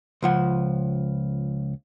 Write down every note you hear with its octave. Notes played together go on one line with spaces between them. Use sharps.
C#2 F3 F#5